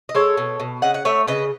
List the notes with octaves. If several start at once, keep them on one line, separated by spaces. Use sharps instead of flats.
D#5
G#3 A4 C#5
B2
B2
C#3 D#5 F#5
F#5
A3 C#5 E5
C#3 B4 D#5